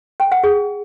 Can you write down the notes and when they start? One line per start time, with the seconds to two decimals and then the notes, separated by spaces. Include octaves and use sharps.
0.20 G5
0.32 F#5
0.44 G#4